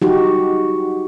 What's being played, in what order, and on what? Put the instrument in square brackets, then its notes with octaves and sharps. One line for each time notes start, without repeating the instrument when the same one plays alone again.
[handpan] D#4 F#4 G4